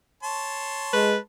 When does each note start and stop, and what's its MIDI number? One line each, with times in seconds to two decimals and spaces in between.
0.23 1.19 73
0.23 1.19 81
0.23 1.19 84
0.93 1.16 56
0.93 1.17 71